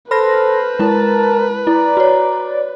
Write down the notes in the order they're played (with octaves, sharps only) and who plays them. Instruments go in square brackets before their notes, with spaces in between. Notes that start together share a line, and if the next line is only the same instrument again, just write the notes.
[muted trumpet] A4 [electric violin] B4 [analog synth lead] C5 [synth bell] B5 F6 A#6
[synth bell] G#3 E4 [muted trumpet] A#4 [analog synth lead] A5
[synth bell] E4 [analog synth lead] D5 [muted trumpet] A#5
[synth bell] F#4 C#5